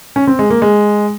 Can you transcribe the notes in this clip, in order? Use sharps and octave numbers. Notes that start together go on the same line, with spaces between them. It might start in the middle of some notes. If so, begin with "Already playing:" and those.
C#4
C4
G#3
A#3
G#3